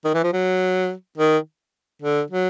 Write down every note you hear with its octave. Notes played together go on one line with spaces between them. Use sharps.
D#3
E3
F3
F#3
D#3
D3
F#3